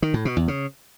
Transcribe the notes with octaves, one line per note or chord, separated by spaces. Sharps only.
D#3
A2
B2
E2
C#3